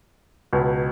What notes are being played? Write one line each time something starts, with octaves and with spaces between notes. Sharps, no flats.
C#2 B2